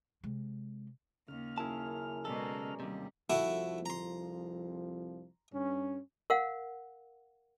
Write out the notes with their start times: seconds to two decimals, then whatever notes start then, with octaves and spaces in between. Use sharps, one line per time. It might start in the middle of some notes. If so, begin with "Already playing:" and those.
0.23 C3 G#3
1.28 D#2 C#3 F6
1.58 F#2 E4 G#4 A5
2.25 B2 G#3 D#4 A4 D5
2.80 D#2 C3 G3
3.30 C2 F2 F3 A3 E4 F#4
3.86 A#5 C6
5.53 G2 C#4
6.30 A#4 F5 F#5